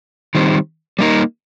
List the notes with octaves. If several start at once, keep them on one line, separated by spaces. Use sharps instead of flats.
D#3 G3 C4
G3 A#3 D#4 A#4